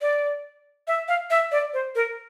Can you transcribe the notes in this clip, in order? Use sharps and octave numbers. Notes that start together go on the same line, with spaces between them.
D5
E5
F5
E5
D5
C5
A#4